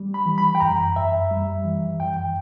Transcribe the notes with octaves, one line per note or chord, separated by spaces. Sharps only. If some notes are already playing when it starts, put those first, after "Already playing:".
Already playing: G3
B5
E3
B5
G5
F#2 A#5
F#2 E5
G3
E3
F#2 G5
G5